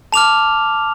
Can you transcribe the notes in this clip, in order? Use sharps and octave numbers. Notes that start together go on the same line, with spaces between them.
A5 D6 F6 F7